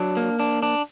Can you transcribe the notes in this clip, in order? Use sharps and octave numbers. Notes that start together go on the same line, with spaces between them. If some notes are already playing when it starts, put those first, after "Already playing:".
Already playing: F#3 D4
A#3
D4
D4